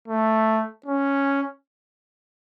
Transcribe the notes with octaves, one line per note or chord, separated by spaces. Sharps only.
A3
C#4